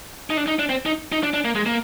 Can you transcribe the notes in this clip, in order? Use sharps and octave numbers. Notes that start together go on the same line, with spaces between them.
D#4
D4
D#4
D4
C4
D#4
D#4
D4
D4
A#3
G#3
A#3